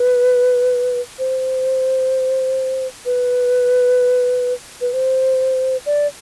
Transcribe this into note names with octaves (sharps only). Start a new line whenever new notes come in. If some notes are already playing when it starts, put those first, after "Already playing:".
Already playing: B4
C5
B4
B4
C5
D5